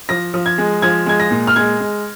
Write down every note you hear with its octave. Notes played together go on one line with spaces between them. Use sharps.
F3 A#6
F3
G#6
G#3
F3 G#6
G#3 G#6
A#6
A#2
F6
G#3 G#6
G#3